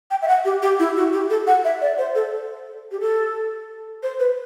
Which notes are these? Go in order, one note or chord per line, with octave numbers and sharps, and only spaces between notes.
G5
E5
F#5
G4
G4
E4
F#4
G4
A4
F#5
E5
D5
C5
A4
G4
A4
C5
B4